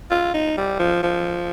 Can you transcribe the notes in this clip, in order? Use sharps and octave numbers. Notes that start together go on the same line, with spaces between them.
F4
D#4
G3
F3
F3